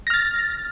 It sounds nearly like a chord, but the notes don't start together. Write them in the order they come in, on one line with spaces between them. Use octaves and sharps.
A#6 F6 A6